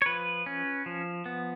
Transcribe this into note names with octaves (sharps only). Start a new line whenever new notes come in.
C#5
F3 B4
C#4
F3
B3